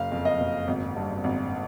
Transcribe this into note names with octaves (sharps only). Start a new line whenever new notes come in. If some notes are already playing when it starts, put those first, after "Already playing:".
Already playing: F#1 F5
F2
D#5
F#1
G#1
G2
G#1